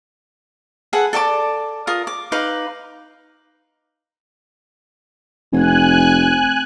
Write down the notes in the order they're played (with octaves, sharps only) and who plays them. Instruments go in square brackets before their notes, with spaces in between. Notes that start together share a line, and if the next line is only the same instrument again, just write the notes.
[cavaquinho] G#4 A4 B4 F#5
A4 D5 A5 D6
F4 A#4 D#6
D6
D#4 B4 F5 D6
[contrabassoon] F1 [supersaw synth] G#5 F#6